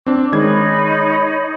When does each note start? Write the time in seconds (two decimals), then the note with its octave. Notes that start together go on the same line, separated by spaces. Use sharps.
0.06 C4 D4 D6
0.32 D#3 G#3 D#4 C#5 B5 G#6